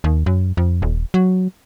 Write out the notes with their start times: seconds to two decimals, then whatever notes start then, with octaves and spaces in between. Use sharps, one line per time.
0.04 D#2
0.26 F#2
0.57 F2
0.82 D#1
1.14 F#3